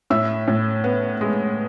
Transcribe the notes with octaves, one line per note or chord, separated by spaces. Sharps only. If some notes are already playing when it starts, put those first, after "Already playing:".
A2 E5 E6
A2
B3
G#3